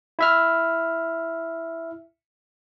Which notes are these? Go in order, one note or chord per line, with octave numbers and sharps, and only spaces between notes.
E4 E5 F6